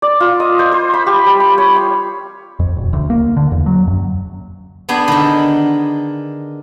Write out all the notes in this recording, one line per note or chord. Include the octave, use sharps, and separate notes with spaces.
D5
F4
D#5
C5
C5
B5
G4
G3
B5
C#5
C6
F2
E1
D2
A#3
D3
E2
F#3
F#2
B3 D4 G#4 G5
D3 D#3